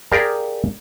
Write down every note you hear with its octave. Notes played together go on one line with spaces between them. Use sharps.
G4 G#4 A#4 D5 F5 G#5